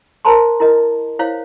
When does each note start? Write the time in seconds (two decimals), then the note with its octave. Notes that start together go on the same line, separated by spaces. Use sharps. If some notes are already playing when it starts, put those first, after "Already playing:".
0.25 A#4 C5 A5 A#5 C6
0.60 E4 A#4 D#5
1.19 E4 C5 C#5 F5